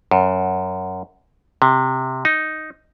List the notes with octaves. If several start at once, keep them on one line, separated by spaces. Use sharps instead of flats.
F#2
C3
D#4